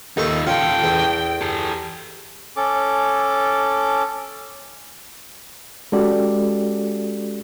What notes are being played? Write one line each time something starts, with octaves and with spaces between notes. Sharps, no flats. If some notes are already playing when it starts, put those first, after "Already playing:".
D#2 D#4 F4 A4 C#6
C#4 F4 A4 G5
E2
G4 A4
C#4 A4 D6
G#3 C#4 F#4 G4 A4 D5